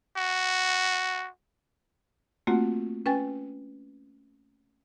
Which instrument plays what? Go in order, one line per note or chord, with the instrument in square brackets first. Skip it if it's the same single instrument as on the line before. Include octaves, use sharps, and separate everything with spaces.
[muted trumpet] F#4
[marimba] A3 A#3 C4 F4 F#4 F#5
C#4 B4 G5 G#5 A6